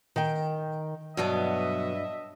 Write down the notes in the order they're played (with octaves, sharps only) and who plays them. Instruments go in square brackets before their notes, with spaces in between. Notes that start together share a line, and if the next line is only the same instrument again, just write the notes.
[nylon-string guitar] D#3 G5
[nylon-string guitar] G2 [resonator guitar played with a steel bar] B2 F#3 B3 [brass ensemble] D#5 E5